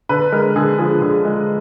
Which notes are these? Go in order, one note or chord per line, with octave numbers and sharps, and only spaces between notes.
D3 B4
G#3 A#4
D3 G#4
F3 G#4
D3 G#4
G#3